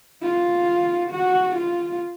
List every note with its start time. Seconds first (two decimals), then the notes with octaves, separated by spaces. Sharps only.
0.22 F4
1.11 F#4
1.56 F4